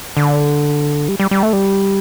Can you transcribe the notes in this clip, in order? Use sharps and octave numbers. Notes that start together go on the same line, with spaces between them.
D3
G3
G3
G3
A3
G3